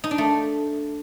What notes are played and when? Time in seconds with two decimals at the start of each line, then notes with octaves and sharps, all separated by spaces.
0.04 D#4
0.11 D4
0.18 A3